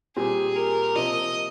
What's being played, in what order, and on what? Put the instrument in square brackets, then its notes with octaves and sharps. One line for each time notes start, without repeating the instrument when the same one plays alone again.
[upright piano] A#2 G3 C4 G4 [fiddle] G#4
[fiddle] A#4
[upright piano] C3 F3 A#3 [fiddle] D#5